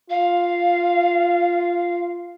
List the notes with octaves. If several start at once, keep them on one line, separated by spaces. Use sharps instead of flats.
F4 F5